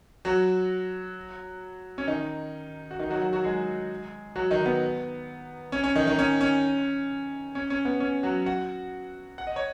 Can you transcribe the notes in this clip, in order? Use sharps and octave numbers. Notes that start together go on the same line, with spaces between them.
F#3 F#4
C#4
D#3 D#4
F#4
D#3 D#4
F#3 F#4
F#3 F#4
F#3 F#4
G#3 G#4
F#3 F#4
D#3 D#4
B3
C#4
C#4
D#3 D#4
D#3 D#4
C#4
C#4
C#4
C#4
B3
C#4
F#3 F#4
F#4 F#5
F#5
D#5
C#5